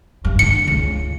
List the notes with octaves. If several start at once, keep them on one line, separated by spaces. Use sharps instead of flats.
G2
D3 C#7
C#2